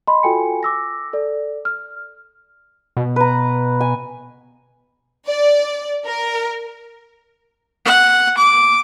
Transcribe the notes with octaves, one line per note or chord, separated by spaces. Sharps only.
D#5 B5 C6
F4 F#4 A4 G5 G#5 C#7
D6 E6 A#6
A4 D5
F6
B2
B4 A#5
G#5
D5
A#4
F#5
D6